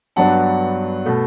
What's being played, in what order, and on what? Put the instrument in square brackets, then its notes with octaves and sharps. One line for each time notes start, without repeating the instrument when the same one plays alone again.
[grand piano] G2 F#3 B3 D4 F#5 A5
B2 A3